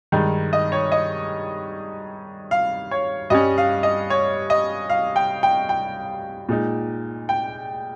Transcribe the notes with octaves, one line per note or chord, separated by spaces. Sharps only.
G2 D#3 G#3 D#4
D#5
C#5
D#5
F5
C#5
G2 G3 C#4 D#5
F5
D#5
C#5
D#5
F5
G5
G5
G5
A#2 G#3 D#4
G5